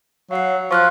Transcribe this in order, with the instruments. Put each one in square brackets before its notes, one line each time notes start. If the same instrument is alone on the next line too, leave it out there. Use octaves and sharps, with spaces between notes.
[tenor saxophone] F#3 [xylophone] F5 C7
[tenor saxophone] F3 [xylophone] C#6 F6 F#6